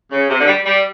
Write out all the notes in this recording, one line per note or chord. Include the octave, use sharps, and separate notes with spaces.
C#3
C3
D3
G3
G3